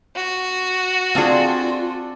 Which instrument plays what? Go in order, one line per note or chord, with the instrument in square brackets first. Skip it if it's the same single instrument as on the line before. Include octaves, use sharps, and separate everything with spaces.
[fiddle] F#4
[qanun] C4 G#4 [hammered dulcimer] D4 A4 F5 [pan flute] F4